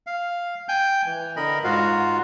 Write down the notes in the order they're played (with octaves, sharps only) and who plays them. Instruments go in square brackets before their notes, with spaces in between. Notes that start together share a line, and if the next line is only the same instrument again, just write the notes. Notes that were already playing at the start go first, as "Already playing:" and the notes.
[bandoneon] F5
G5 G#5 G6
E3
D3 A#4 D#5 B5
G#2 F4 F#4 F5